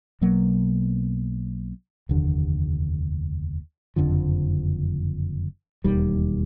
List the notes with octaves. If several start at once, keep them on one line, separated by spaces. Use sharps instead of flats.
B1 B2 F#3 A#3
F1 D#2 D3
F#1 F2 D3 F3
E1 D#2 D#3 G3